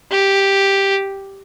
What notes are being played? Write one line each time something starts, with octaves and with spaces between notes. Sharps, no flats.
G4